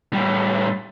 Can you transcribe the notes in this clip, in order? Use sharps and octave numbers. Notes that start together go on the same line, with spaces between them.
A2 G3